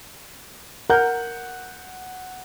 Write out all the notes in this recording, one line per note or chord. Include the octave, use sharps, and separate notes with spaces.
A#4 F#5 G6